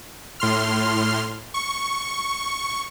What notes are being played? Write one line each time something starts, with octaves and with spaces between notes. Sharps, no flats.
A2 C6 F6
C#6